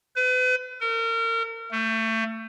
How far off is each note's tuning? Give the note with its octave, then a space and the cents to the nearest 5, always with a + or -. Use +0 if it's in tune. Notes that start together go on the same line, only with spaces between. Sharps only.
B4 +40
A#4 -35
A3 +25